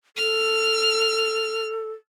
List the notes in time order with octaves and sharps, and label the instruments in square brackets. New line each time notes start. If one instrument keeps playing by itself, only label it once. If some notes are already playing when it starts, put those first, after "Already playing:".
[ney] A4 [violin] F6